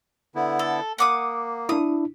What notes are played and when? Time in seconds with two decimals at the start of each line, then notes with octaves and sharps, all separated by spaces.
0.35 D3 B3 E4
0.59 A4
0.98 A#3 F#5 D6 D#6
1.69 D4 E4 D#6